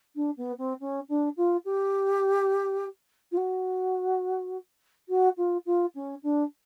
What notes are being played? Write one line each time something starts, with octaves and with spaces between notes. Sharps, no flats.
D4
B3
C4
C#4
D4
F4
G4
F4
F#4
F#4
F4
F4
C#4
D4